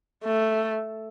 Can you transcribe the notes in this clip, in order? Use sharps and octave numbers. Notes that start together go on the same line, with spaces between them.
A3